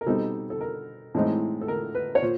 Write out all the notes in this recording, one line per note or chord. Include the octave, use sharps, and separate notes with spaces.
A#4
B2 G3 C4 D#4 A4
A4
A#4
A2 E3 G#3 C4 D#4
A4
A#4
B4
C#5
A#2 C5